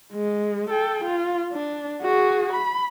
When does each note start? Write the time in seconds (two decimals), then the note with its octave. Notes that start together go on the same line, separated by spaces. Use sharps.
0.13 G#3
0.70 A4 G5
1.05 F4
1.52 D4
2.02 F#4 G#4
2.53 B5